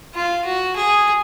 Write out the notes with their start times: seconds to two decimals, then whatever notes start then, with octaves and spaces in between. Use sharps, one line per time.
0.15 F4
0.45 F#4
0.76 G#4